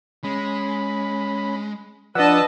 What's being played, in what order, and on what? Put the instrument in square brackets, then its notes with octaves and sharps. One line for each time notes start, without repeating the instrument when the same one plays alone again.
[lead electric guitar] G#3 [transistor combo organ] C#4 B5
[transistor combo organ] F3 D5 E6 [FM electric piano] D4 F#5 [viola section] B4 D#5 A5